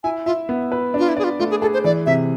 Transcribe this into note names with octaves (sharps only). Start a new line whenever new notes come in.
E4 G#5
F4 E5
B3
B4
D4 F4
E4
G#4 D5
F4
A3 F4
G#4
G#4 A4
C5
E3 D5
C3 E5